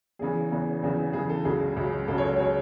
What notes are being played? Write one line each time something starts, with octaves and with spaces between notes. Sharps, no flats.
E2 C#3 E3 G#4
E2 C#3 E3
E2 C#3 E3
E2 C#3 E3 G#4
A4
C#2 C#3 F#3 G#4
C#2 C#3 F#3
C#2 C#3 F#3 A4
C#5
C#5
C#3 F#3 C#5